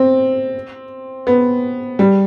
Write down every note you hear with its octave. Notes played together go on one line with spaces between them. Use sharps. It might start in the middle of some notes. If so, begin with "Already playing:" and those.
Already playing: C4
B3
G3